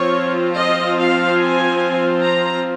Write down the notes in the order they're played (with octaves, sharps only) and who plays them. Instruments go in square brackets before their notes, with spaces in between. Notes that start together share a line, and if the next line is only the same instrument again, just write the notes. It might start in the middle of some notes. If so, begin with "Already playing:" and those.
Already playing: [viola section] F3 C4 F4 C#5
D#5
F5
G#5
A#5